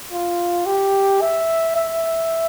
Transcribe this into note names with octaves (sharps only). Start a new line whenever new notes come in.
F4
G4
E5
E5